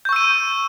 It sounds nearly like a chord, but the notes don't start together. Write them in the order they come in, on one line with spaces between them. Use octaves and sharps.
G6 C#6 E6 D#7